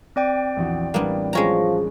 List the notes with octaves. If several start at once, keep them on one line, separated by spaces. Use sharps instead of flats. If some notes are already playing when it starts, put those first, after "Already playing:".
C4 D5 G5
A#1 E2 F#4
A1 G3 A#3 B3 D4
F3 G#3 C#4 A#5